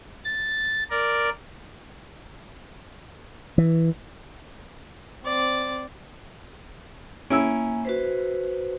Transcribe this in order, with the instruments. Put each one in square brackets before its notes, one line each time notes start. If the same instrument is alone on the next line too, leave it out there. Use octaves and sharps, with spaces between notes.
[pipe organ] A6
A#4 D5
[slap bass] E3
[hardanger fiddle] C4 D5
[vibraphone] A#3 G#5 [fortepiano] C#4 E4 E6
[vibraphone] F#4 B4 C5